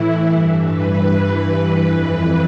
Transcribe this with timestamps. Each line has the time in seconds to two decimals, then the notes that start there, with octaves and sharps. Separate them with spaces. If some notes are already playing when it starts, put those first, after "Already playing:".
Already playing: A2 E3 E4
0.25 G2 E3
0.64 B4
1.04 G2 E3
1.83 F2 E3